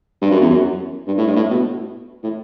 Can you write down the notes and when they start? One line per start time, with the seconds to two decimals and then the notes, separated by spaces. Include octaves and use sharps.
0.22 G2
0.31 F#2
0.41 E2
0.50 F#2
1.07 G2
1.18 A2
1.27 G2
1.36 A2
1.51 B2
2.23 A2